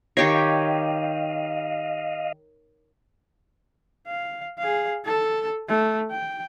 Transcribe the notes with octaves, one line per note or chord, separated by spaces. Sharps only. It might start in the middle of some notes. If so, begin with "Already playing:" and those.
D#3 G4 C#5 D#5 F5
F5
G#4 F5
A4 A5
A3
G5